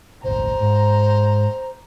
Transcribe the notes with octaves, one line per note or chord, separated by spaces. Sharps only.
D#1 G#1 C5 A#5
G#2